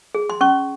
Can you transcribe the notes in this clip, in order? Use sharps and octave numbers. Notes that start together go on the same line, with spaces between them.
G#4
C6
C#4 C#6